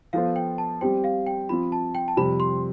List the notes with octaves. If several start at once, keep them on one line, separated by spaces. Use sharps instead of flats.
F3 B3 F4 A4 C5 F5
G5
A5
G3 C4 G4 C5 G5
F5
G5
F3 C4 F4 B5
A5
G5
A5
F2 C3 G3 B5
C6